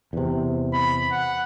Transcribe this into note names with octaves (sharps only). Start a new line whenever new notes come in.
E2 C3
B5
F#5